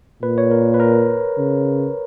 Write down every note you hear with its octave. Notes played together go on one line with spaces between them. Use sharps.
A#2 B4
C#5
A#4
B4
A#4
C#3